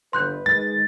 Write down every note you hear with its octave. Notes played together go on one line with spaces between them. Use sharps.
G1 B4 C6 F#6 G6
D#3 G#3 A6